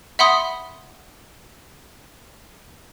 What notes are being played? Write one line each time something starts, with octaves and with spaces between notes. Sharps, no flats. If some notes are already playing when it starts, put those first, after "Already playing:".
E5 F#5 B5 C6 D#6